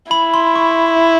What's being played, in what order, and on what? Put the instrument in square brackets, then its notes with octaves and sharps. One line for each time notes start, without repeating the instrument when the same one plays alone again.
[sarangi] E4 [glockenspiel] B5
[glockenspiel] C6
C#6